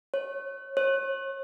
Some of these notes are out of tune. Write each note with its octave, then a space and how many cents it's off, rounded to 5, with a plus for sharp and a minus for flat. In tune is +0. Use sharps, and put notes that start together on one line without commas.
C#5 -25
C#5 -40